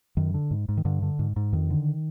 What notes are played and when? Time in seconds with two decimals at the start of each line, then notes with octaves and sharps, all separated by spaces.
0.17 F#2 D#3
0.34 D3
0.51 G#2
0.69 G#2
0.77 D#3
0.85 G2 D3
1.02 D3
1.19 G#2
1.36 G#2
1.53 F2 D#3
1.70 D3